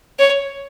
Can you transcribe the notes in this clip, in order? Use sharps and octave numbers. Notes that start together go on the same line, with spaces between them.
C#5